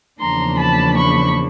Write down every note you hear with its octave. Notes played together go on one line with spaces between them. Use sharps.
E2 C#3 F3 A#3 D4 A#5 C6
A5 B5
B5 C#6